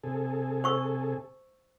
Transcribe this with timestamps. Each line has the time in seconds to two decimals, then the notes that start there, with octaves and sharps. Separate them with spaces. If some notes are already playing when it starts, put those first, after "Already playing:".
0.03 C3 G#4 A4
0.64 C5 C#6 E6